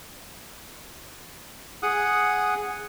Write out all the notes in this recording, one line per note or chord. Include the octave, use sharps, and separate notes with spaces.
G#4 F#5 D#6 F#6